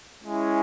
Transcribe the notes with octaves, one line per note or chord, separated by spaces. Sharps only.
G#3 C#4 E4